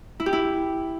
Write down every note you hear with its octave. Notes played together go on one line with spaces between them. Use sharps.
E4
G4
E4